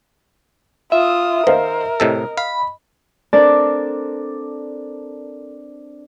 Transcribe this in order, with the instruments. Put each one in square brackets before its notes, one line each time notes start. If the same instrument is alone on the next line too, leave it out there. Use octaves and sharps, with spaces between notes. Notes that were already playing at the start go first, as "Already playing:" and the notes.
[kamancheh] F4 D#6 [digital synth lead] E5
[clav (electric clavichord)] D#3 [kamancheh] A#4 [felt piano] C5 D#5 F5
[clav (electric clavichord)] A2 C3 A4 [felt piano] D#5
[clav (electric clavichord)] F5 [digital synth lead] B5
[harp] C4 D4 A4 A#4 D5 A5